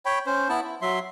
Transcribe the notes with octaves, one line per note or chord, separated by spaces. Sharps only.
C#5 G5 B5
C#4 C5
B3 E4 A5
E4
F#3 E5 C6